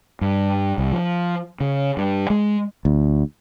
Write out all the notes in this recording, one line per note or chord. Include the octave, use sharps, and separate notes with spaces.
G2
C2
F3
C#3
G2
G#3
D2